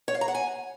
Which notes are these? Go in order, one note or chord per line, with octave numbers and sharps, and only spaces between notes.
C#5
F5
A#5
F#5
G#5